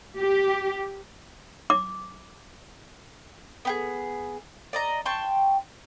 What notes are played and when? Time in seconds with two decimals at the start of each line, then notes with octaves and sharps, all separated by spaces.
0.18 G4
1.70 D6
3.65 B3 G4 G#4
4.73 D5 D#5 A#5
5.06 G5 A5 C6 C#6